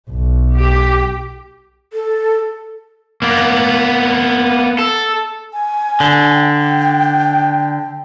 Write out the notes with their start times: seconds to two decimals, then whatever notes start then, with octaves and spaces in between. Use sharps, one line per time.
0.11 B1
0.57 G4
1.93 A4
3.22 A#3 B3
4.79 A4
5.53 G#5
6.00 D3
6.33 G5